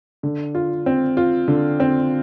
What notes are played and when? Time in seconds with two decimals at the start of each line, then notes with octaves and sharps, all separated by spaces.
0.23 D3
0.55 F4
0.86 C4
1.17 F4
1.48 D3
1.80 C4